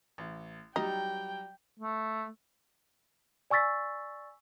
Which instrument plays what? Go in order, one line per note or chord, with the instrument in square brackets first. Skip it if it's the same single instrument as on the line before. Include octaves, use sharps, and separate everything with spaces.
[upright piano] A1
[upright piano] F#3 G3 [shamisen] D#4 [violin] G5
[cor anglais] A3
[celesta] D5 G#5 C#6 E6 A6 B6